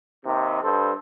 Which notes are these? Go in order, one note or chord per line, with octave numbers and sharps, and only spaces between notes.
D#2 C3
G2 A4 C5